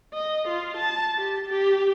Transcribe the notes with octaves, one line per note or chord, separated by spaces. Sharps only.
D#5
F4
A5
G4
G4